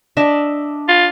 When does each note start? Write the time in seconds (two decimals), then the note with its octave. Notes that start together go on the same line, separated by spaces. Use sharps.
0.17 D4 D#5 E5
0.89 F4